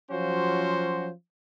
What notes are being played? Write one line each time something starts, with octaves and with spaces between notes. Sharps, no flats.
F3 F#3 C#4 F4 F#4 C5